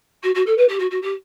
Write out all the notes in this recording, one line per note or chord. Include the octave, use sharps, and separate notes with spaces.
F#4
F#4
A4
B4
G4
F#4
F#4
G4